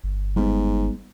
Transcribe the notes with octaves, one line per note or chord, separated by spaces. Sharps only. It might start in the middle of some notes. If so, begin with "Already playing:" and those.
G1
G#2 G3 B3